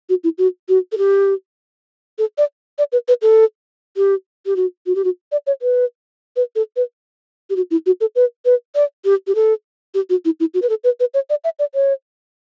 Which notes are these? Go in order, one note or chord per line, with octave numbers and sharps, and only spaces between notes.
F#4
E4
F#4
F#4
A4
G4
A4
D5
D5
B4
B4
A4
G4
G4
F#4
F#4
G4
F#4
D5
C#5
B4
B4
A4
B4
G4
F#4
E4
F#4
A4
B4
B4
D5
G4
G4
A4
G4
F#4
E4
E4
F#4
B4
A4
B4
B4
C#5
D5
E5
D5
C#5